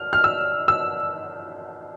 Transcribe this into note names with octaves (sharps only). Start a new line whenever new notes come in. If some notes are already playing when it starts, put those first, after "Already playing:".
Already playing: F6
F6
E6
E6